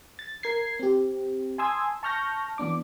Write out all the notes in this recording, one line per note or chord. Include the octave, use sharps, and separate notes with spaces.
A6
A#4 G#6 C7
C4 G4
G#5 A5 C6 D#6 E6 G#6
A5 C#6 F6 G6 A#6
E3 B3 D4 D6